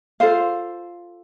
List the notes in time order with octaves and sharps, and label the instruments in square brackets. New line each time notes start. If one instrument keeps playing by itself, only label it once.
[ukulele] F4 A4 C5 F5